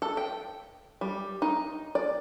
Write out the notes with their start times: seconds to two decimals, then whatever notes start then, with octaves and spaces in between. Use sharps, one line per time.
0.02 A4
0.17 G5
1.01 G3
1.42 D#4
1.95 D5